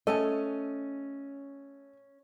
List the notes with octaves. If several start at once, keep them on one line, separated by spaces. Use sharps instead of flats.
A3 C#4 A4 D#5 G#5